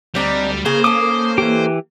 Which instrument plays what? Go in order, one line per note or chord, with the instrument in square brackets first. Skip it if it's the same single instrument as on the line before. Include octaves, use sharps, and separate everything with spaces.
[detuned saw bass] D2 [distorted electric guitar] G3 [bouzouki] C4 D4 D#4
[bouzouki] C#3 G#4 A#4 [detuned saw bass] A#3 [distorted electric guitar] C5
[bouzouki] C#4 A4 [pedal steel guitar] D6 D#6
[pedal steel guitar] E3 G4